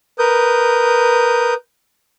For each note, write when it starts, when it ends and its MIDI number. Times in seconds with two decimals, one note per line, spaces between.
0.19 1.54 70
0.19 1.54 71
0.19 1.54 87
0.19 1.54 91